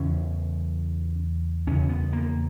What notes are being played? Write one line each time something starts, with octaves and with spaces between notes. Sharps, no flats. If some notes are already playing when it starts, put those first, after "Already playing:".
Already playing: E2 C#3 C#4
E2 C#3 C#4
B3
A#3